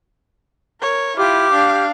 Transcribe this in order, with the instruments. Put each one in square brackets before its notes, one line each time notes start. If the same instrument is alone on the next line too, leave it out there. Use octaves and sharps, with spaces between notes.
[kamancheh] A#4 C#5
[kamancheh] E4 F4 [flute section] G4 D6 F6
[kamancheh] D4 F5